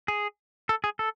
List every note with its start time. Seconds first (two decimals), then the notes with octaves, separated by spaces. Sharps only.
0.08 G#4
0.69 A4
0.84 G#4
0.99 A4